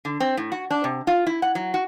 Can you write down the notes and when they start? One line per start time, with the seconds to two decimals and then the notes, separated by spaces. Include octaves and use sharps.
0.05 D3
0.20 C4
0.37 A2
0.52 F#4
0.70 D4
0.84 C3
1.07 F4
1.27 E4
1.42 F#5
1.55 F#3
1.74 F#4